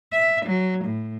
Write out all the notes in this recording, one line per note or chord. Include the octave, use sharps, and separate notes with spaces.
E5
F#3
A2